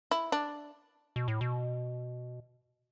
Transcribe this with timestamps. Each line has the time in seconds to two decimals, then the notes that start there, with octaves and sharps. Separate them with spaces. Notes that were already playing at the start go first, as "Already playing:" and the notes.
0.11 E4
0.32 D4
1.16 B2
1.28 A2
1.41 B2